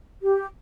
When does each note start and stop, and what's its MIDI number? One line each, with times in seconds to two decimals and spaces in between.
0.22 0.46 67